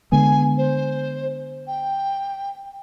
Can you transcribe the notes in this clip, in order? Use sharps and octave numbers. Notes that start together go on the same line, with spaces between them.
D3 G#3 B3 G#5
C5
G5